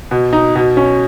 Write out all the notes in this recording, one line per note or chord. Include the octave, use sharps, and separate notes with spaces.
B2
D#4
B2
C#4